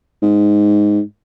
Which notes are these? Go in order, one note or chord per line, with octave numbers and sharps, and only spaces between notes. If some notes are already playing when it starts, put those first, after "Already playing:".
G#2